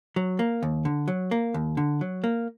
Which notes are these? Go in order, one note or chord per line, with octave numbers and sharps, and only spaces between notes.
F#3
A#3
D#2
D3
F#3
A#3
D#2
D3
F#3
A#3